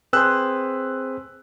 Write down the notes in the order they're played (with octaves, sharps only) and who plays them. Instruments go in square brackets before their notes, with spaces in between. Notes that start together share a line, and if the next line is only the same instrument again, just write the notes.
[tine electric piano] C4 G#4 C5 [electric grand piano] B4 E6 F#6